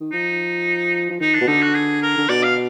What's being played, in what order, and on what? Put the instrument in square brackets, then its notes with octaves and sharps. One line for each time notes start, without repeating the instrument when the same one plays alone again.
[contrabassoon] D#3
[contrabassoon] F3 [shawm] D#4
[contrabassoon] F3
[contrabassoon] D#3 [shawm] D#4
[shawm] D4
[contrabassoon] B2
[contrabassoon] D3 [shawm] D#4
[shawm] F#4
G#4
A#4
[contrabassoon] D3
[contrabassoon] B2 [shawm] D5
[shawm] F5